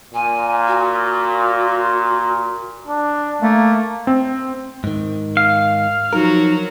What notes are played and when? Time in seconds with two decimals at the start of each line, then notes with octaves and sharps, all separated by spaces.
0.14 A#2 G#5
0.68 F#4
2.87 D4
3.42 A3 A#3
4.07 C4
4.84 G#2 D#3
5.37 F5
6.13 F3 F#3 D#4 F#4 A#4